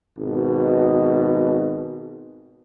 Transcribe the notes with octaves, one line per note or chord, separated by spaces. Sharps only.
G#1 B2